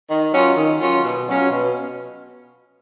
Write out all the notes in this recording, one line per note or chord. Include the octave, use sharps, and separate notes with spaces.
D#3
F#3 C#4 F4
D#3
F#3 C#4 F4
B2
F#3 C#4 F4
B2